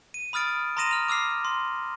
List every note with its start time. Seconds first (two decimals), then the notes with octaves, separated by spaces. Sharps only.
0.14 D#7
0.33 B5 D#6 F6 A6 D7
0.77 A#5 C6 D#6 A#6 D#7 E7
0.91 F6 F7
1.08 D6 E6 F6 C7
1.45 C6